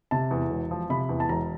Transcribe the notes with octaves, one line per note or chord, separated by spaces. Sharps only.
C3 A5
E2
E1
F3
C3 B5
E2
A5
E1 A#5